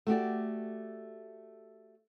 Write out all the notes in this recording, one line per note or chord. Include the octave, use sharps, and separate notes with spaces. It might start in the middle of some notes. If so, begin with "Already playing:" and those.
A3 F#4 G4 D5